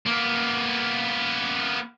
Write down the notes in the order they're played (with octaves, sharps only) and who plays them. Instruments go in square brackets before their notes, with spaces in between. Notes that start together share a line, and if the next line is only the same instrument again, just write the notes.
[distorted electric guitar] A#3 B3